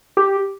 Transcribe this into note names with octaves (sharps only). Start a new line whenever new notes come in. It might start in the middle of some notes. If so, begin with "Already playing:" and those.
G4